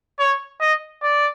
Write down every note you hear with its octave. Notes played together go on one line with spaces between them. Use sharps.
C#5
D#5
D5